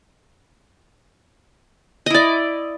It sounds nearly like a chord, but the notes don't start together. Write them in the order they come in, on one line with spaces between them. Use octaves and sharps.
D#5 E4 D5